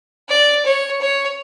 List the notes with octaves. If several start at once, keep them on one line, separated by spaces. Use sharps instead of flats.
D5
C#5
C#5